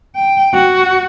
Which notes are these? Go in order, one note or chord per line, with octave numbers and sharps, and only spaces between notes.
G5
F#4